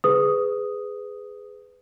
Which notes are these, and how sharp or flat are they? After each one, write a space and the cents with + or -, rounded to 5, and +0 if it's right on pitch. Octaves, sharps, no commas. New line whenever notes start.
G#4 +0 B4 +20 D#6 +0